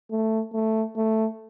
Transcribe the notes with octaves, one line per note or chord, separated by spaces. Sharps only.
A3
A3
A3